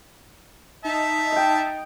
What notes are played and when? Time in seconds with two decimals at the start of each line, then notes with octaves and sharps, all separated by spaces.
0.85 D#4 E5 A5
1.32 D#5 G5